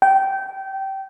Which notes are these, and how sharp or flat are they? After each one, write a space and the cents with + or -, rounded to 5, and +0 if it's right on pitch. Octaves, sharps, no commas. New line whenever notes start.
G5 -20